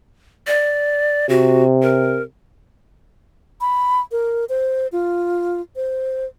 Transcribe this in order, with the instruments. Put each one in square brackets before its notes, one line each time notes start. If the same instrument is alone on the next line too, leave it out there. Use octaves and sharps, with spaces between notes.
[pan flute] D5
[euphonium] C3 [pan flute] F#4
[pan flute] A#4
[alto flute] B5
A#4
C5
F4
C5